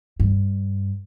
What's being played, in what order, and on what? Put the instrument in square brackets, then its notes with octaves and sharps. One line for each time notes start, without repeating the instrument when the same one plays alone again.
[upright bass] G2